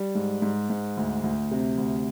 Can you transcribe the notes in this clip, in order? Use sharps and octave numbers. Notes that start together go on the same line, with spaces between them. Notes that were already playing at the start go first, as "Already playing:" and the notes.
Already playing: G3
G#2
G#2
G#2
D2
D2
C3
D2